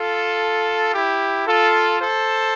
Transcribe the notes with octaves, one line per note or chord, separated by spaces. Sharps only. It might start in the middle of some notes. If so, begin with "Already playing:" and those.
Already playing: F4 A4
E4 G4
F4 A4
A4 C5